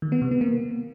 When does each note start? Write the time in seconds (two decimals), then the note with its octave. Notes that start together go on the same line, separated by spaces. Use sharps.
0.02 D#3
0.12 B3
0.22 C3
0.31 B3
0.41 A#3